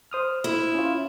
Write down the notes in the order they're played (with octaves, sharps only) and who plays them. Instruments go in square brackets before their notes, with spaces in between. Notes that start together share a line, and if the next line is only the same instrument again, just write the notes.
[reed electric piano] C5 D#6 F6
[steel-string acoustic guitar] E4
[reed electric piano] C#4 F4